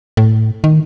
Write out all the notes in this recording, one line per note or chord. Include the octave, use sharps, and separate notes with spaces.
A2
D#3